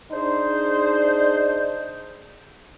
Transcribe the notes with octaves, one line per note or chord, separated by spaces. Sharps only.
D4 D#4 G#4 C5